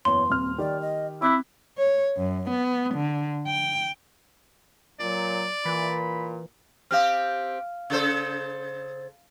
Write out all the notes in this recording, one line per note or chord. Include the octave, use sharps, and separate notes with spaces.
F#1 E2 C#5 C6
D#1 C4 F6
D#3 G4 D5
D#5
C4 E4 D6 F#6 B6
C#5
F#2
B3
D3
G5
A#2 F#3 D5
A#2 E3 B5
C4 G4 F5 F6
C#3 A4 C5